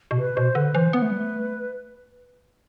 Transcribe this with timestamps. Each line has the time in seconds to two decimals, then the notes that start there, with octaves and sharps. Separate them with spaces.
0.11 B2
0.18 C3 B4
0.36 B2 C5
0.55 D3 B4
0.75 E3 C5
0.93 B3 B4
1.02 A3
1.11 G3
1.19 A3